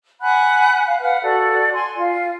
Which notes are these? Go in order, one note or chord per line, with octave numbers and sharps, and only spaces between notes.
F#5 G#5 B5 F#6
F5
B4 F5 F#5 F6
F#4 A4 D5
G#5 C6
F4